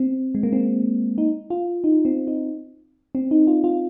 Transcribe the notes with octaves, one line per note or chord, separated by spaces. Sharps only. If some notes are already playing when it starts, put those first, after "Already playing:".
Already playing: C4
G#3
A#3
C4
D#4
F4
D#4
C4
D#4
C4
D#4
F4
F4